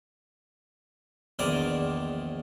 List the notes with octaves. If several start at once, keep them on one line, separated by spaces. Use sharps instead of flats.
A#1 E2 D#3 C5 D5 A#5